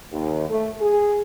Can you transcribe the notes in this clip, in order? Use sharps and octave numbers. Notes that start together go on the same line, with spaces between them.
D#2
A3
G#4